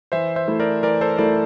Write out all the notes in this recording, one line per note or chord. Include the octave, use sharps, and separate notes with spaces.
E3 C5 E5
C5 E5
A3 E4
A#4 D5
E3 A#4 D5
A4 C5
A3 E4 A#4 D5